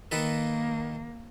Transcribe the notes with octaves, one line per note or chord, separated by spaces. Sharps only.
D#3 A#3 A4 B4